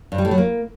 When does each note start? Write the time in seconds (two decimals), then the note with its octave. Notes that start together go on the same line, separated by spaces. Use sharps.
0.12 G2
0.18 G3
0.25 A2
0.31 F#3
0.38 A#3